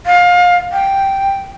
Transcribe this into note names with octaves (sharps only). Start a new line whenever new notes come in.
F5
G5